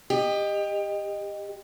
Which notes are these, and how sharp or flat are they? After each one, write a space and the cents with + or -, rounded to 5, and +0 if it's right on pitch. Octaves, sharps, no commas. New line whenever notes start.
G4 +25 D#5 -10